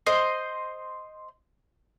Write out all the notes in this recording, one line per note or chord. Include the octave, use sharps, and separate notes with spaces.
C5 D#5